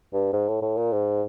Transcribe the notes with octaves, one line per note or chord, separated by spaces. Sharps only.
G2
G#2
A2
A2
A#2
G#2